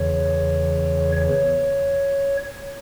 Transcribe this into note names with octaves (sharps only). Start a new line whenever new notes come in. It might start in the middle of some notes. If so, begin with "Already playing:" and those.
Already playing: E2 C#3 E3 C#5
C#5